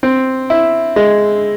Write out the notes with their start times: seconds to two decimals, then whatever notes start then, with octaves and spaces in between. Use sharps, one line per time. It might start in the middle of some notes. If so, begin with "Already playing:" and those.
0.03 C4
0.50 E4
0.96 G#3